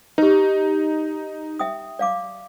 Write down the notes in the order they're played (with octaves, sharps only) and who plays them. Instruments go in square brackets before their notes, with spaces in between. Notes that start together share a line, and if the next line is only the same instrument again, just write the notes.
[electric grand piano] D#4 [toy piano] G4 B4
[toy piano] E5 G5 D#6
D5 F5 D6